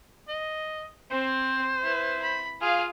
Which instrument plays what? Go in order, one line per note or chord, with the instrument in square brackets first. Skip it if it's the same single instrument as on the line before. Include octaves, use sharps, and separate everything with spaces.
[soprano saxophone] D#5
[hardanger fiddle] C4 [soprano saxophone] C5
[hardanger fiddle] E4 B4
B5
[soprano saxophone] F4 [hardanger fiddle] G#4 F5